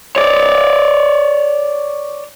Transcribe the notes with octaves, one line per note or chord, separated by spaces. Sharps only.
C#5 D5